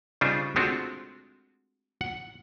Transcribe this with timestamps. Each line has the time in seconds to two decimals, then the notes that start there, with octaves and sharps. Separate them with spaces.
0.21 C#3 G3 D4 D#4 F4 C5
0.56 G#3 A3 C4 D4 F4 F#4
2.01 F#5